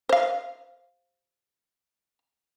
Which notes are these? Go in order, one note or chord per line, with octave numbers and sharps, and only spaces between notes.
C5 F5